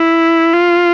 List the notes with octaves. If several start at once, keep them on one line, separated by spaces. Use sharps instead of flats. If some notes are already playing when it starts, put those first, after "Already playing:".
Already playing: E4
F4